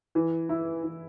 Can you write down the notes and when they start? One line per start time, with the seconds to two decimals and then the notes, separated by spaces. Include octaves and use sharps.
0.15 E3
0.49 E4
0.84 E3